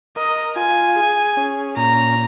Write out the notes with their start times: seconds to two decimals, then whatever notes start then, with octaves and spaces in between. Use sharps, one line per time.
0.16 A#4 D#5
0.56 F4 G#5
0.96 G#4
1.37 C#4
1.77 A#2 A#5